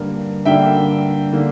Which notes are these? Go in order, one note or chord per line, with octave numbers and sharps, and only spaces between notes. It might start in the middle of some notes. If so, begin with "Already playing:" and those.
Already playing: G2 D3 G3 A#3
G2 D3 A#3 E5 G5
D3 A#3